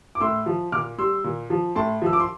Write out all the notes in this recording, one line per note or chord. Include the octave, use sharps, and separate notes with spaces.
D6
A2 C6 E6
F3
A#2 D6 F6
G3 C6 E6
A#2
F3
A2 A5 C6
F3 E6
D6
C6